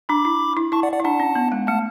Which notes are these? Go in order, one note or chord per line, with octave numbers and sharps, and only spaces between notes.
D4 B5 D6
E4
E4
E4 A5 C#6
D5 F#5
D5 F#5
E4
D4 F#5 A5
C#4
B3
G#3
A3 F#5 A5